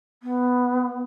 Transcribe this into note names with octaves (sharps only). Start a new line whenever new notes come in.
B3